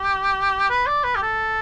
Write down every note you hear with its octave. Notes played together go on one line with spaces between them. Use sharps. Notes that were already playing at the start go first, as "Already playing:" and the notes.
Already playing: G4
B4
D5
B4
G4
A4